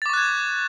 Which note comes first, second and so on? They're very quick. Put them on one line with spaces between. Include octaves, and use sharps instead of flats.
A6 D6 C#6 F#6 G#6